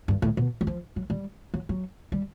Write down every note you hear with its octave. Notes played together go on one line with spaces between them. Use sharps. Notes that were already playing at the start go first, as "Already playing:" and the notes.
G2
A2
B2
F#3
F3
F#3
G3
F#3
F#3
G3